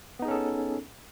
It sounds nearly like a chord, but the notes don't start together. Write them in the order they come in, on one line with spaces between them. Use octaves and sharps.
B3 D#4 G#4 C#4 A4